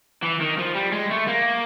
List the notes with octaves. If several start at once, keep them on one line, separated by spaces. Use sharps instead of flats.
E3
D#3
F3
G3
G#3
A3
A#3